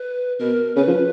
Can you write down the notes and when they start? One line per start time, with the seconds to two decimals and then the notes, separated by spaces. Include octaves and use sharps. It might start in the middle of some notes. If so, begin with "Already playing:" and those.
Already playing: B4
0.40 B2 A#4
0.76 C#3 B4
0.88 F3